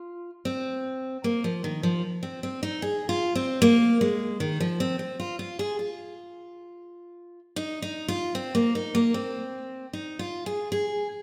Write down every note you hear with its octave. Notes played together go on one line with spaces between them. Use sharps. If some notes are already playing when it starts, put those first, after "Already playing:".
Already playing: F4
C4
A#3
F3
D#3
F3
C4
C4
D#4
G#4
F4
C4
A#3
G#3
D#3
F3
C4
C4
F4
F4
G#4
F4
D#4
D#4
F4
C4
A#3
D#4
A#3
C4
D#4
F4
G#4
G#4